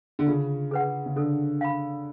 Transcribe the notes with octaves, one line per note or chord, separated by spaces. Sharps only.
D3
C#3 F4
G#4 B4 F#5
C#3
D3 A4
F5 B5